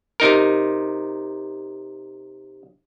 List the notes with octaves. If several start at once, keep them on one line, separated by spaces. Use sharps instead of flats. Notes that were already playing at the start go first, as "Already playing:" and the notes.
C3 D#4 A#4